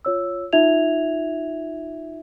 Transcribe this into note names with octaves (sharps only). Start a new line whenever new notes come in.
F4 C#5 E6
D#4 F4 E5 G#6 F7